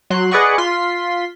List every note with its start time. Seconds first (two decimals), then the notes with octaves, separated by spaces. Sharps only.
0.10 F#3 C6 F#6
0.31 G#4 B4 D5 D#5 F#5 C#6
0.58 F4 C6 B6